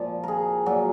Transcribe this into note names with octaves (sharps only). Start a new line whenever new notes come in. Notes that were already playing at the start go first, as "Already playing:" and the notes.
Already playing: A#2 F3
G#4 A#4
A#2 F#3